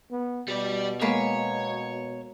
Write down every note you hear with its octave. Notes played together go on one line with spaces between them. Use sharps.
B3
B2 G3 D5
G#3 A#3 B3 C#5